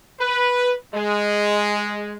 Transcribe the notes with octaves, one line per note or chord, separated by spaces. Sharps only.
B4
G#3